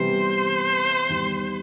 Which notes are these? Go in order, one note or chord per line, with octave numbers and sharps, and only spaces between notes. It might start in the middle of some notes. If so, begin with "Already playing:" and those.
Already playing: C3 E3 G3 B3 C5
E2 D#3 G3